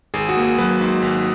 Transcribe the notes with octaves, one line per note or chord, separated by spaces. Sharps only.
G#1 G#4
F#4
A#3
G#4
F#3 B4
G#2
G#1